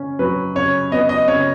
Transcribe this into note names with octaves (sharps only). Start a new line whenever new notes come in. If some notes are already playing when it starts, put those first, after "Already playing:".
Already playing: C#3 C#4
F#3 B4
C#3 C#5
B3 D#5
D#5
C#3 C#5